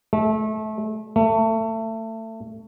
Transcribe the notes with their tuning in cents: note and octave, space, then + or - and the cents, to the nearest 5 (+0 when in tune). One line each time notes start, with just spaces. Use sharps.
A3 -25
A3 +25